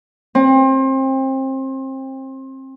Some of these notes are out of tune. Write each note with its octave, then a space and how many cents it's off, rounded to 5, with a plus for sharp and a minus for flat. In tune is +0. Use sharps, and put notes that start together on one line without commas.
C4 +30